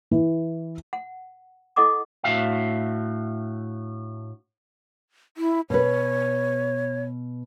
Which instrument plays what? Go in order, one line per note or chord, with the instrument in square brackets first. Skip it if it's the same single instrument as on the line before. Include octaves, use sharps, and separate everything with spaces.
[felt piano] E3
[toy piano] F#5
E4 A4 D#5 F#5 D6 D#6
[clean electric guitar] A2 D4 F#4 E5 F5
[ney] E4
[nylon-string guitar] B2 B4 [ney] C#5